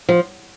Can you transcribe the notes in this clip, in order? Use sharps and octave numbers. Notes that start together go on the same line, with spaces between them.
F3